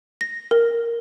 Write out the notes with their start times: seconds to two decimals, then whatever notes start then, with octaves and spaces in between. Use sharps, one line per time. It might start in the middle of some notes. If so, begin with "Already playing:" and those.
0.21 A#6
0.51 A#4